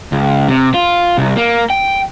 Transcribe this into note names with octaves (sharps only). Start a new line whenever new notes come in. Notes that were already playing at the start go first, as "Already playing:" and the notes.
C#2
C3
F4
C2
A#3
G5